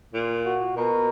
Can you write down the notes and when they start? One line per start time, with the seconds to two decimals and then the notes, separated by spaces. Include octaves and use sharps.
0.14 A#2
0.45 F#4
0.76 B2 A#4